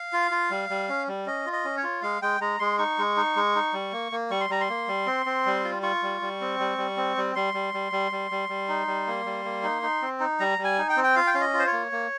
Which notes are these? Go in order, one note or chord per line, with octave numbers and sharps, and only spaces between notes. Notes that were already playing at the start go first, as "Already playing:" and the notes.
Already playing: F5
F4
F4
G3
G3
C#4
G3
C#4 D#5
F4
D#5
C#4
C#5
F4
G#3 F5
G#3 G5
G#3 A#5
G#3 C6
D#4 C#6
G#3
D#4
G#3
D#4
G3
A#3
A#3
G3 C#6
C6
G3 A#5
C6
A#3
G3
C4
C4
G3
F4
F4 C#6
G3
G3
C4
G3
G3
C4
G3
G3 C6
G3
G3
G3
G3
G3
G3
D#4
G3
A#3
G3
A#3
D#4
D#4
C4
D#4
G3 A#5
G3
G#5
D#4
G5
C4
G5
F4 F5
G5
C#4 F5
D#5
F4
C5
C#5
A#3
A#3